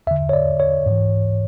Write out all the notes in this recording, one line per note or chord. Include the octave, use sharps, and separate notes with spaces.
E2 D3 E5
C#5
D5
C#5
G#2 E3